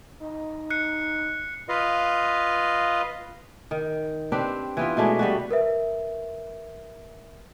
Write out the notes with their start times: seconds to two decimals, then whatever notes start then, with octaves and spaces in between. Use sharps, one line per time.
0.20 D#4
0.70 F#6 C7 C#7
1.69 F4 B4 D#5 F5
3.71 D#3
4.32 C4 D4 G4 B4
4.77 E3 B3 F4
4.97 B2 G#3 A3 D4
5.19 G3 B3 F#4
5.51 A#4 B4 E5